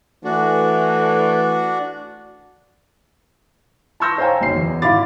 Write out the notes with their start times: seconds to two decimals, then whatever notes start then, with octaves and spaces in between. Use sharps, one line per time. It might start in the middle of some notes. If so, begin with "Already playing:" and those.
0.24 E3 A3 D4 F#4
4.00 A5 C6 C#6 E6 G6 A#6
4.18 C5 C#5 F5 G5 G#5 A#5
4.41 F#1 B1 C#4 C7
4.56 E2
4.82 G#1 E4 F5 B5 D6 A6